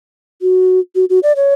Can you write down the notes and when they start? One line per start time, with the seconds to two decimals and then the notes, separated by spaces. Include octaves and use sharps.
0.42 F#4
0.95 F#4
1.10 F#4
1.23 D5
1.36 C#5